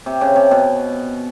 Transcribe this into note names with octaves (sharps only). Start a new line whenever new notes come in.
C3
C#3
C3
B2